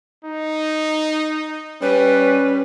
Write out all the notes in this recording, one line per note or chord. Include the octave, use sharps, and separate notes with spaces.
D#4
G3 C#4 B4